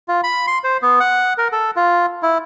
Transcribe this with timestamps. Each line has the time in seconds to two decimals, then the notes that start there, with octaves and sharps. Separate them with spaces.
0.08 F4
0.24 B5
0.47 C6
0.64 C5
0.82 B3
1.00 F#5
1.38 A#4
1.52 A4
1.76 F4
2.23 E4